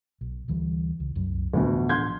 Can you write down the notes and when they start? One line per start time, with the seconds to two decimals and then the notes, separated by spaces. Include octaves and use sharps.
0.21 B1
0.48 D2 E3 G3
1.00 C#2
1.15 C2 F#2
1.54 A1 D2 B2 F3
1.89 C6 G6 G#6